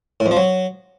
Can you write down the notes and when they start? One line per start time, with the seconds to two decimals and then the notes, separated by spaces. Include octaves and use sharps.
0.20 A2
0.26 F2
0.31 F3
0.37 F#3